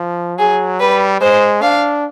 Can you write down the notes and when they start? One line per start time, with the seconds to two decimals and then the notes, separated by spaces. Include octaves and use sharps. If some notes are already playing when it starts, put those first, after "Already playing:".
Already playing: F3
0.38 F#3 G#4
0.80 G3 B4
1.21 G#3 C5
1.62 D4 F5